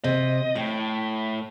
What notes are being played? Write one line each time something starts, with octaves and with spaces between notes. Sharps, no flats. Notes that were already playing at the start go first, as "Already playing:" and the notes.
C3 D#5
A2 G5